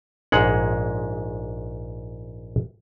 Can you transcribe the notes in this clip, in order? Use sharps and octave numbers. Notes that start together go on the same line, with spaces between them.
A#1 G#2 G#3 F5 F#5